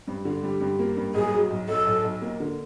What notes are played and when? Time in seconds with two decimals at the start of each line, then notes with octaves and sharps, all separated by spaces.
0.07 G2
0.25 D3
0.43 G3
0.61 G2
0.79 A#3
0.97 G2
1.14 B1 G#4
1.32 F#3
1.50 B1
1.68 B1 A4
1.86 B1
2.04 B1
2.22 A#3
2.40 D3